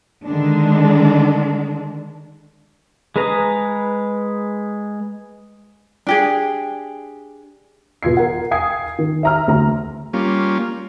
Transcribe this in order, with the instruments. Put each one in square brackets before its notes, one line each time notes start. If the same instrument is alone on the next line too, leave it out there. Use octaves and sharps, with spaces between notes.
[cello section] D3 D#3 G#3 D4
[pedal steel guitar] G#3 G#4 B4 A#5
[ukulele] D4 G4 G#4
[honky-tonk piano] B2 F4 G#6 C7
A#4 F#5
F5 G5 G#5 D#6 G#6 C7
D#3
E5 A#5 F6
D2 A#5
[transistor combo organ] G3 A#3 C#4 F4